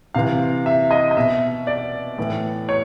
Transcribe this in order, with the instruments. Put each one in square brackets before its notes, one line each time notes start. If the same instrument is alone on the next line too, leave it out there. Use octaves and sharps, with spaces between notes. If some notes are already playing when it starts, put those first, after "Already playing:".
[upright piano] C3 E3 F5
E5
D#5
D#5
B2 E5
D5
A2 E3
C#5